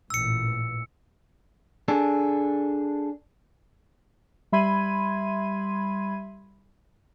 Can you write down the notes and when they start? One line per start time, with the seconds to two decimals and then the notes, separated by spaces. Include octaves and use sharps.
0.10 A1 A#2 E3 E6 C#7
1.88 D4 G#4 A4
4.52 G3 E5 B5 C6 G#6 D#7